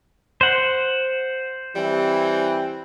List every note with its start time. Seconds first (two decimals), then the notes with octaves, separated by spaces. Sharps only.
0.41 C5 F#5
1.75 E3 G3 C4